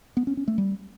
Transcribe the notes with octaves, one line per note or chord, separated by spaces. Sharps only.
B3
C#4
C#4
A3
G3